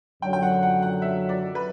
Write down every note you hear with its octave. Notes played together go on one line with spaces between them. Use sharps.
F#2 D3 F#3 G5
G5
F#5
F#5
F#5
E5
D5
B4